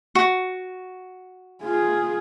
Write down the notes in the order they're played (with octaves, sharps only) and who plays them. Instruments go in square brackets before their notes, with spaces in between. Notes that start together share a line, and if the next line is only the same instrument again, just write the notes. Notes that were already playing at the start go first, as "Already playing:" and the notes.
[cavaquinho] F#4
[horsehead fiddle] F4 G#4